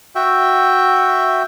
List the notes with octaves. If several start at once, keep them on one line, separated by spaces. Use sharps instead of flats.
F#4 E5 G5